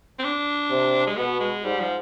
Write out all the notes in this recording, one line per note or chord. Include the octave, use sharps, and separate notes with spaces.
C4
D4
C3
G#3
B2 B3
G#3
G#2 G3
F3